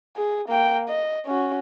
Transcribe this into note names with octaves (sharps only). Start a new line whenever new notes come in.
G#4
A#3 G5
D#5
C#4 F#4